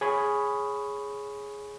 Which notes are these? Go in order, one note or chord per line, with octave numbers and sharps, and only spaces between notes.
G#4 C#5 G#5 B5 C#6 D#6